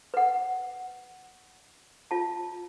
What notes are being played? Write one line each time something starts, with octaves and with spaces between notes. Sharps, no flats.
B4 F#5
F4 A5